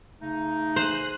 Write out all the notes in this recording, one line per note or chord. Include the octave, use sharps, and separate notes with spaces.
C#3 A3 D#4
G#4 C5 F#6